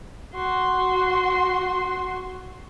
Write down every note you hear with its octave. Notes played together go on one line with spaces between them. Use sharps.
F#4 C6